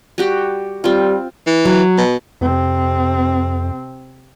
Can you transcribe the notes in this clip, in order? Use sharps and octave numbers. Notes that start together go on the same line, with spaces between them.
G3 F#4 G4
G3 C4 F4
E3
F#3
B2
F2 C3 C4